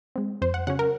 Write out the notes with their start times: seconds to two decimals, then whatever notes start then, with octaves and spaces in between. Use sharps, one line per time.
0.16 G#3 C4
0.42 F2 C5
0.54 F#5
0.67 C#3 F#3 C#4 F#5
0.79 A#4